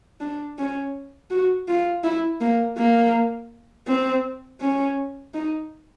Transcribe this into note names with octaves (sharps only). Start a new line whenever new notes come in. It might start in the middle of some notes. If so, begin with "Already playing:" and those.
D4
C#4
F#4
F4
E4
A#3
A#3
C4
C#4
D#4